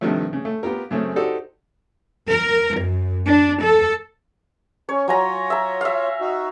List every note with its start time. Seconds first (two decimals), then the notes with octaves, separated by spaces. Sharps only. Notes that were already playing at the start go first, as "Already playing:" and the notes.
0.01 G2 C3 D#3 F3 A3
0.33 C#3
0.45 A3
0.63 B3 F4 G4 A#4
0.91 F#2 C#3 A3 C4
1.16 D#4 F#4 G4 A4 C5 D5
2.27 A#4
2.79 F#2
3.26 D4
3.62 A4
4.89 C#4 C#5
5.08 F#3 F4 C#5 G#5 A#5
5.50 E5 A#5
5.81 E5 F5
6.21 D#4 F#4